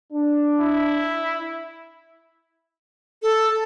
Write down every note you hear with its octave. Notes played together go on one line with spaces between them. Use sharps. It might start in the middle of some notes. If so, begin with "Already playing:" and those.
D4
E4
A4